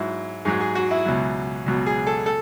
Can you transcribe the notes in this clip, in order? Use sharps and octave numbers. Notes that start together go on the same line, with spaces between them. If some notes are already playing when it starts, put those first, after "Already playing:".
Already playing: G#2 F#3 E4
G#2 F#3 G#4
G#4
F#4
E4
C#2 B2 F#3
C#2 B2 F#3
G#4
A4
A4